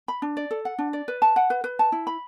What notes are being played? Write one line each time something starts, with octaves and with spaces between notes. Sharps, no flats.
B5
D4
D5
A4
F#5
D4
D5
B4
A5
F#5
B4
B4
A5
E4
B5